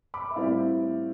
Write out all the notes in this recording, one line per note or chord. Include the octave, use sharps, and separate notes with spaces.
B5 D6
E5
A2 G3 C4 E4 D5 F5